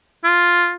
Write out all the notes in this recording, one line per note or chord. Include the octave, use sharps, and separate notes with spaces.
F4